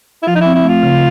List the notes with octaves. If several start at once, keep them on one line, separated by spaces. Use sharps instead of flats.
E4
F3 F4
D#4
E4
C4
E4
A3 F4
C#3